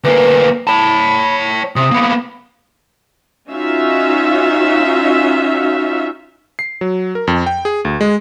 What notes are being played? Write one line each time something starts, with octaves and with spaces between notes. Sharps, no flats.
D2 A#3 B4
C#5 A5 B5
C3 D#6
A#3 B3
C#4 D#4 F4 F#4 E5 F5
C7
F#3
A#4
F2
G5
G#4
D2
G#3